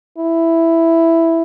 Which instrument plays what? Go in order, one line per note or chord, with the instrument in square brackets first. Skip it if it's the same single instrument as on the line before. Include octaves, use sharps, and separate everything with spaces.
[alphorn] E4